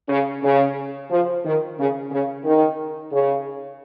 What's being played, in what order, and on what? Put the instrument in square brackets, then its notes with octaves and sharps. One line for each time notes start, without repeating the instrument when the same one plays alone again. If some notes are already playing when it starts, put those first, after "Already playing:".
[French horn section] C#3
C#3
F3
D#3
C#3
C#3
D#3
C#3